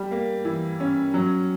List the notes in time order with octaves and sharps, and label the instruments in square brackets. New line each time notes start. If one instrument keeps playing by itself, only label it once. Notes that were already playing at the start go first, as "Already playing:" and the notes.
Already playing: [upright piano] G3
A#3
E3
C#4
F#3